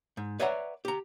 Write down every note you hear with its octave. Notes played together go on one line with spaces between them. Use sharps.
G#2
B4 C#5 D5 E5 F#5 A#5
G4 A#5